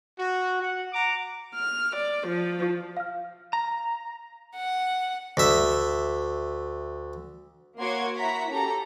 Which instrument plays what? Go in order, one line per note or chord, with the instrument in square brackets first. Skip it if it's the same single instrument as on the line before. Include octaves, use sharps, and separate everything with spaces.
[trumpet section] F#4
F#5
F#5 A#5 D6
[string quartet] F6
D5
F3
[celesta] F5 F6
[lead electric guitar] A#5
[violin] F#5
[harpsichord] D2 E5
[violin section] A#3 F#4 C#5 C6 D6 G#6
E4 F#4 F#5 A#5 B6
C#4 G4 A4 A#5